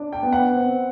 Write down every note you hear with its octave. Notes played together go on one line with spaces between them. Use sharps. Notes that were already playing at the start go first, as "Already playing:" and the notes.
Already playing: D4
G5
B3
F#5
C4